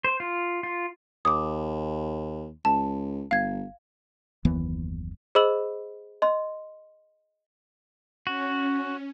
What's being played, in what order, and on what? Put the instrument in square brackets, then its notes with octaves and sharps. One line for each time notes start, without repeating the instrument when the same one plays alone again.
[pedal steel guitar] C5
F4
F4
[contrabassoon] D#2 [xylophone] D6 D#6
[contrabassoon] C#2 [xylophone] A5
[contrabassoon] G1 [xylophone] F5 G#6
[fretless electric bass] F#1 D#2 E3 B3
[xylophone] G#4 C5 D#5 B5 E6 F#7
D#5 C6
[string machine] C#4 [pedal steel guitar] F#4